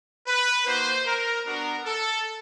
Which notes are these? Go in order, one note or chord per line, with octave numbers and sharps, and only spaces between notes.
B4
A#3 D#4 F#4 C5
A#4
B3 D4 F#4 A#4
A4